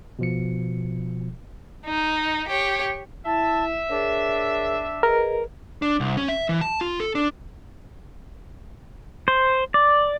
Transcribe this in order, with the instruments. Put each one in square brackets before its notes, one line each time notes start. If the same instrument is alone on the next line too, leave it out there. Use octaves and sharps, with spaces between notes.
[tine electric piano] B2 F3 C#7
[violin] D#4
G4 C#5
[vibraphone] E4 [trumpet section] E5 [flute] A5
[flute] D4 [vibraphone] G#4 A#4 C#5
[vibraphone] G#4 B4 D#5 [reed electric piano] A#4
[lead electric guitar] D4
C2
C#4
E5
E3
A5
F4
A4
D4
[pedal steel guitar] C5
D5